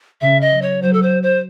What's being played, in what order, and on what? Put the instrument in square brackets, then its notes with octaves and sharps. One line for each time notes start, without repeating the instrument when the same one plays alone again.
[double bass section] C#3 [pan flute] E5
[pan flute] D#5
[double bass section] F#3
[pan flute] C#5
[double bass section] F#3 [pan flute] C5
[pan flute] A4
C5
C5